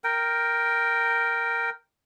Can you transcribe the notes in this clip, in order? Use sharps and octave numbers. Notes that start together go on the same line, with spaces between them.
A#4 G5